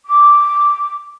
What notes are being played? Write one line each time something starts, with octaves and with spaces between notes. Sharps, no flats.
D6